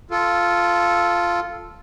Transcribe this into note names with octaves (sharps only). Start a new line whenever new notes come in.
F4 A4